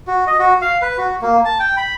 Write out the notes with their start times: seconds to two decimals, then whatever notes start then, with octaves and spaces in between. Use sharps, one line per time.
0.08 F#4
0.27 D#5
0.39 F#4
0.62 F5
0.82 B4
0.98 F#4
1.22 A#3
1.45 A5
1.59 G5
1.77 B5